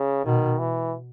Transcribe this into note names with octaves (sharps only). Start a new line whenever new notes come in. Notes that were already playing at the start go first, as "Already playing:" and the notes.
Already playing: C#3
B2 D#3
E3